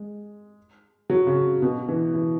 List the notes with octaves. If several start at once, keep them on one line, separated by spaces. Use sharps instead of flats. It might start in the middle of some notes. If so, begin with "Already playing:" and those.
Already playing: G#3
F#3
C#3
B2
E3
E3